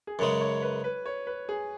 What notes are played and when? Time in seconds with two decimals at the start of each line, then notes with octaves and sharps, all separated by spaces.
0.07 G#4
0.19 F#2 C#3 G#3 B4
0.41 C#5
0.62 B4
0.84 B4
1.06 C#5
1.27 B4
1.49 G#4